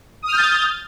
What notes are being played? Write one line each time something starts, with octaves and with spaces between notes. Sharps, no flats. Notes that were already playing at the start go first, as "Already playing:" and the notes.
D#6 F6 G6 A6